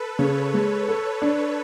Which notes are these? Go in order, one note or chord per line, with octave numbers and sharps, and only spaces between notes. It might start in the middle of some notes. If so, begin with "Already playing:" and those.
Already playing: A4 B4
C#3 C#5
G#3
A4
D4